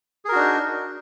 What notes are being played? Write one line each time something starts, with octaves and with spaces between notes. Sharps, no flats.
D4 D#4 F#4 G#4 A#4